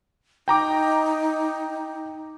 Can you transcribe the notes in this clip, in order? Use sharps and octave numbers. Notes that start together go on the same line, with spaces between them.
D#4 G5 A#5 D6